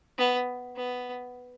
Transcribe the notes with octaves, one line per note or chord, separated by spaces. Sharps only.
B3
B3